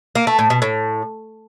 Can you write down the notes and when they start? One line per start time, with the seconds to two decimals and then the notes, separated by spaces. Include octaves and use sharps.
0.15 A#3
0.27 A3
0.39 A2
0.50 B2
0.62 A2